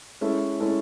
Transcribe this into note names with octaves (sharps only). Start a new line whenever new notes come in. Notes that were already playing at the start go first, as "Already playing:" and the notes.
G#3 C#4 E4 A4
G#3 C#4 E4 A4